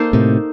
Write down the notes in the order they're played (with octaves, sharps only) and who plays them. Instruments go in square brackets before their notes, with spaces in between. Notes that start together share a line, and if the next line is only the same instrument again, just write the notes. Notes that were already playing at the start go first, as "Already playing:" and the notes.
Already playing: [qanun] A#3 D#4 A4 C5
[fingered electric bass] A2 C3